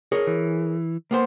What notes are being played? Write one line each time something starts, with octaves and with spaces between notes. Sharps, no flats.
G#4 A#4 C#5
E3
A#3 B3 C5